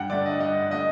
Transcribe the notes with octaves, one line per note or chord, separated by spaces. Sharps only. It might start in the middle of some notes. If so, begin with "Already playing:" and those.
Already playing: G2 F#5 G5
D3 A3 D5
D#5
G2 D#5
D3 A3 D#5